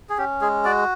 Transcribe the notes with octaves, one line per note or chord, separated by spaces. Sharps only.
G#4
C#4 G4
G#3 G#4
F#4 D5